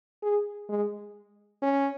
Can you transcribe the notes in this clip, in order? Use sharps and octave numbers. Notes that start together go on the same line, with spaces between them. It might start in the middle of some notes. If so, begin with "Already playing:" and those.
G#4
G#3
C#4